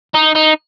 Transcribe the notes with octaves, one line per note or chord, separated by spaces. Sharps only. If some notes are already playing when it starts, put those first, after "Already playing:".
D#4
D#4